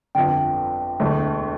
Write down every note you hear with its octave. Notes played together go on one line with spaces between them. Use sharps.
G1 F2 D3 G5
E1 D2 D3 A3 E4